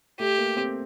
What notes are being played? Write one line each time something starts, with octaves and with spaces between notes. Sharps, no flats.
A3 G4
A#3
C4